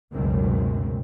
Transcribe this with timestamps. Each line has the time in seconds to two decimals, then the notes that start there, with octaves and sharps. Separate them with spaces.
0.12 F1 C#2 F#2 B2 D#3 C4